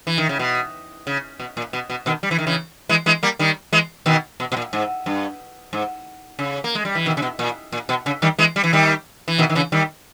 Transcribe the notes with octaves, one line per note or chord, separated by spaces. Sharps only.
E3
D#3
C#3
B2
C#3
B2
A#2
B2
B2
B2 D#3
G3
E3
D#3
C#3 E3
E3 G#3
E3 G#3
G3 A#3
D#3 G3
E3 G#3
B2 D#3
B2
B2
A#2
G#2
G2
G#2
C#3
A#3
G#3
G3
E3
B2 D#3
C#3
B2
A#2
A#2
B2
C#3
D#3 G3
E3 G#3
G3
E3
D#3 G3
E3
B2 D#3
D#3
C#3 E3
D#3 G3